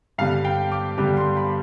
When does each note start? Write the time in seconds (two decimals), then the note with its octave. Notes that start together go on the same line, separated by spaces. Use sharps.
0.18 G2 D3 G3 B3 F5
0.44 G5
0.72 D6
0.98 G2 D3 G3 B3 D6
1.17 C6
1.37 B5